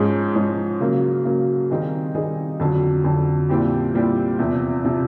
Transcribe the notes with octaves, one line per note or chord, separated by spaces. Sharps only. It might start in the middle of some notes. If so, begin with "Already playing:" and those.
Already playing: G#2 F3 G#3 C#4
G#2 F3 G#3 C#4
C#3 F#3 A#3
C#3 F#3 A#3
D#3 G3 C4 D#4 G#4
D#3 G3 C4 D#4 G#4
F2 D3 F#3
F2 D3 F#3
A#2 G3 C4 E4 G4
A#2 G3 C4 E4 G4
E2 C3 F3
C3 F3